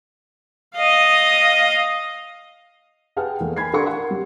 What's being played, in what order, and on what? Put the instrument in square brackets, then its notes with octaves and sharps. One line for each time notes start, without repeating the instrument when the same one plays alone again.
[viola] D#5 F5
[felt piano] G#4 B4 F#5 G5 A5 F6
E2 A3 A#3
G5 G#5 B5 G#6 C7
D4 A4 A#4 F#5 C6 C#6
F#5
F#3 G4